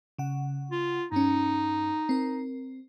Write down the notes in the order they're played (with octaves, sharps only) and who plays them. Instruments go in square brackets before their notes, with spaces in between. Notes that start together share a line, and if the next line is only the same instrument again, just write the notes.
[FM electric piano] C#3 F#5
[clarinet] F4
[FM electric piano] G2 C#4 [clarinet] D#4
[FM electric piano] C4 A#4